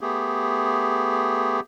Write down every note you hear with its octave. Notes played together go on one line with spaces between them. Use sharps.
A3 B3 G4 G#4